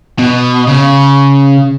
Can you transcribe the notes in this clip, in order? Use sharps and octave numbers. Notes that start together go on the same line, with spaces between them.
B2
C#3